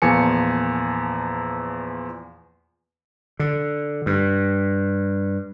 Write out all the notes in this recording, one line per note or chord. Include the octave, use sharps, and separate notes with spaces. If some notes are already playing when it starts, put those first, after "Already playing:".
E2 A#2 F3 G#5 A5 C#7
D3
G2